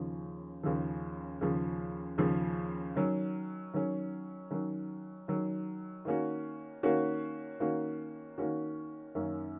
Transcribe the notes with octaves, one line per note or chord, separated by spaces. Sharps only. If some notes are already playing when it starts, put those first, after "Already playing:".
Already playing: D#2 C#3 F3
D#2 C#3 F3
D#2 C#3 F3
D#2 C#3 F3
D#3 F#3 C#4
D#3 F#3 C#4
D#3 F#3 C#4
D#3 F#3 C#4
D#3 A#3 C#4 F#4
D#3 A#3 C#4 F#4
D#3 A#3 C#4 F#4
D#3 A#3 C#4 F#4
F#2 D#3 A#3 C#4